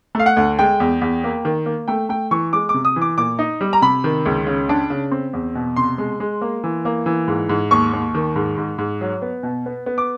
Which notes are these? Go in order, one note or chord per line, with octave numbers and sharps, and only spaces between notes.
A3 F5
F#5
D2
G#3 G5
E2
E2
A#3
D#3
A#3
A3 G5
A3 G5
E3 C#6
G#3 D6
D6
C3
D#6
E3
D6
A#2 D6
D#4
G3
A#5
C3 B5
D#3
C#2
C#3
D4
C#3
C4
E2
B2
C3 C6
G#3
G#3
A#3
E3
A#3
E3
G#2
G#2
D#2 C#6
D#2
D#3
G#2
G#2
G#2
F#3
B3
B2
B3
B3
D6